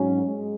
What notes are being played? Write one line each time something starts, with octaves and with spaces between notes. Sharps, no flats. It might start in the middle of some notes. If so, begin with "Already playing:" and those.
Already playing: G#2 F#3 C#4
G#3